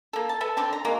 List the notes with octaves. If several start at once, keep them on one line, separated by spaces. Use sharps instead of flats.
A#3 A4
A5
A4 B4 E5
D3 C4 A5
A#5
G#3 A#3 F#4